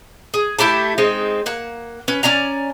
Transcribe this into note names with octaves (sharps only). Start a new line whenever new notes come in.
G#4
A3 E4 G4 A5
G#3 C4 D#4
A#3 F#5
C#4 B4
C#4 D5 G#5 A#5